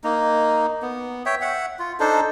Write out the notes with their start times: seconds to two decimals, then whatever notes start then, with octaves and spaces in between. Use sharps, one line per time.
0.04 A#3 D#4
0.82 B3
1.26 C#5 E5 G5
1.41 E5 F#5
1.79 F4
2.00 D4 D#4 A4 C5